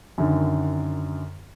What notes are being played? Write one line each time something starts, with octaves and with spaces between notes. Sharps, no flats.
F#2 D3 D#3